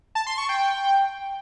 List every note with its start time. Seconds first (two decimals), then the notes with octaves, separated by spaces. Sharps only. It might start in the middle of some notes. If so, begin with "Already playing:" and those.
0.15 A5
0.27 C6
0.38 C#6
0.49 G5